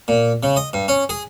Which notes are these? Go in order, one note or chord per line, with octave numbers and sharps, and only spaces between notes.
A#2
C#3
D#5
G2
C#4
G#4